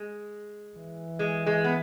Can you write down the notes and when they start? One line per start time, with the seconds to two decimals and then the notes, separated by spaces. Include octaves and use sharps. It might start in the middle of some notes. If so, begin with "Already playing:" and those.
Already playing: G#3
0.78 E3
1.19 G#3
1.46 G#3
1.64 B3